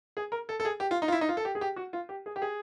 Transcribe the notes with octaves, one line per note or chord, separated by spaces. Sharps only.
G#4
A#4
A4
A4
G#4
G4
F4
D#4
F4
E4
D#4
F4
A4
G4
G#4
G4
F#4
F4
G4
G#4
G4
G#4